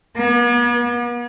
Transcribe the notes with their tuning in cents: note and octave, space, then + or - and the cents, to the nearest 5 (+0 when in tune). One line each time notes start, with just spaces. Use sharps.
B3 -45